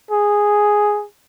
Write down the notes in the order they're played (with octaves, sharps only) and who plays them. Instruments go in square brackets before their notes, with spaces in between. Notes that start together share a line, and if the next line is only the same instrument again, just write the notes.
[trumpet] G#4